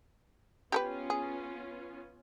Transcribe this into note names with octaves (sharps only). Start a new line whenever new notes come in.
B3 C#4 F4 G4 A#4 B4
G#4